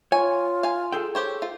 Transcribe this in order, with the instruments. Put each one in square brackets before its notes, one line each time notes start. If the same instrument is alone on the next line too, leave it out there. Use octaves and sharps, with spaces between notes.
[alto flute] F4 [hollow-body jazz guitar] C#5 [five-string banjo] G#5
[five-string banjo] F5 G#5
[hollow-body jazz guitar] G#4 A4 G5
[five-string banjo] G4 C5 C#5
F4